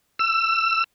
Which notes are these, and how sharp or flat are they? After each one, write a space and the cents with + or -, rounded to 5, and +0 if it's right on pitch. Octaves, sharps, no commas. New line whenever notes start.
E6 +25